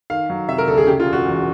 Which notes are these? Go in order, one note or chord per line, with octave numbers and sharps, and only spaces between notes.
D#3 F5
F#3
C3 E5
A#4
D2 A4
G#4
C#3 G4
F4
E1
F#4
E2